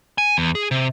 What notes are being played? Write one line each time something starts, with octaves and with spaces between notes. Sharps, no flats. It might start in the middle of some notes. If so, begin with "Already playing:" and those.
G#5
E2
G#4
C3